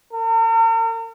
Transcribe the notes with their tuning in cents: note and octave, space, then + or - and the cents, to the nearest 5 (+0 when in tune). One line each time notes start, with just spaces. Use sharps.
A#4 -45